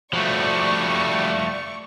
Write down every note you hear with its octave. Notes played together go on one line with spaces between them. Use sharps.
F3 G3 A3 F#4 D5 C#6